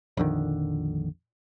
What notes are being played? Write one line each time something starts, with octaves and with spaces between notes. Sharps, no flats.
A#1 F2 D3 D#3